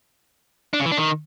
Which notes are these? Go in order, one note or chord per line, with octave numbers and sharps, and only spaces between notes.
D4
C#3
E3
D4
D#3